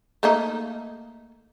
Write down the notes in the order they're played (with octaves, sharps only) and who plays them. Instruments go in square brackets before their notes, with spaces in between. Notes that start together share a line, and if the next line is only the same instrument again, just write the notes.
[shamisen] A3 A#3 D#4